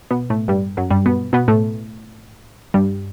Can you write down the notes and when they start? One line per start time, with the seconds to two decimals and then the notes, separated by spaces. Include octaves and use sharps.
0.11 B2 B3
0.30 A2 A3
0.48 G2 G3
0.77 F#2 F#3
0.91 G2 G3
1.06 B2 B3
1.33 B2 B3
1.48 A2 A3
2.74 G2 G3